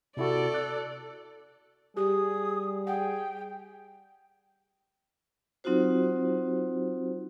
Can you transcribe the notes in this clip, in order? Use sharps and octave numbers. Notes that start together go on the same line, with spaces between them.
C3 E4 F#4 A4 D5
F#6
G3 G4 G#4 D#6
G#4 F#5 G5
F#3 C4 D#4 F4 F#4 C5